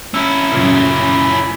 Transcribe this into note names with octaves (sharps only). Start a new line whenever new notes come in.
C#4 E4 E6
F#2 A#2 C#3